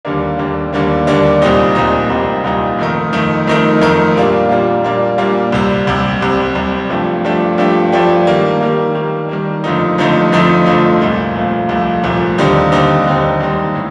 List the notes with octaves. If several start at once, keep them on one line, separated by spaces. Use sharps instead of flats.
D#2 D3 G3 A#3 D4
D#2 D3 G3 A#3 D4
D#2 D3 G3 A#3 D4
D#2 D3 G3 A#3 D4
C2 A#2 G3 C4 D#4
C2 A#2 G3 C4 D#4
C2 A#2 G3 C4 D#4
C2 A#2 G3 C4 D#4
F2 D#3 A3 D#4 A#4
F2 D#3 A3 D#4 A#4
F2 D#3 A3 D#4 A#4
F2 D#3 A3 D#4 A#4
A#2 G3 A#3 D4 F4
A#2 G3 A#3 D4 F4
A#2 G3 A#3 D4 F4
A#2 G3 A#3 D4 F4
C2 C3 G3
C2 C3 G3
C2 C3 G3
C2 C3 G3
G2 F3 A3 D4 G4
G2 F3 A3 D4 G4
G2 F3 A3 D4 G4
G2 F3 A3 D4 G4
D#3 G3 A#3
D#3 G3 A#3
D#3 G3 A#3
D#3 G3 A#3
F2 D3 F3 A3 D#4
F2 D3 F3 A3 D#4
F2 D3 F3 A3 D#4
F2 D3 F3 A3 D#4
C2 A#2 F3 A3
C2 A#2 F3 A3
C2 A#2 F3 A3
C2 A#2 F3 A3
D#2 D3 G3 C4 D#4
D#2 D3 G3 C4 D#4
D#2 D3 G3 C4 D#4
D#2 D3 G3 C4 D#4
A2